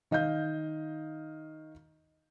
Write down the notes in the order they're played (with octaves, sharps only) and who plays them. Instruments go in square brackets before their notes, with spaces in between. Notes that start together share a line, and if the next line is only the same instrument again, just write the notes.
[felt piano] D#3 D#5 F5 G6